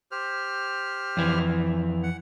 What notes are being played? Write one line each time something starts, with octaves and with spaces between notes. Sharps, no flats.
G4 C5 F6
F2 E3
F#5